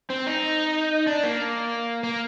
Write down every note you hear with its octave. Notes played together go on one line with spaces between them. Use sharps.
C4
D#4
D4
A#3
A#3